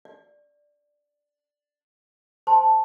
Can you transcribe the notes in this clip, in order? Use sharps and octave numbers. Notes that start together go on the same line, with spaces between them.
D5
C5 G#5 A5 C6